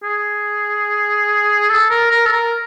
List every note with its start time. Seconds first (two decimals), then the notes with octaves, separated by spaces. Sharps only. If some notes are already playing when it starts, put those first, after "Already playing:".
0.03 G#4
1.69 A4
1.90 A#4
2.11 A#4
2.26 A4
2.32 A#4